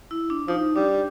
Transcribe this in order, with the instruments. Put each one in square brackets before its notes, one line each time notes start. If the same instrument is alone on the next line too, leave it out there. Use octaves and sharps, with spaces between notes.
[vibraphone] E4
D4
[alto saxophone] F3 [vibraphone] D#4
[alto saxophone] G3 [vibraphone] D4